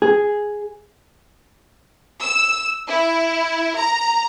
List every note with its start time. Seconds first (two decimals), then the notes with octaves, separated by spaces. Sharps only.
0.02 G#4
2.22 E6
2.89 E4
3.78 A#5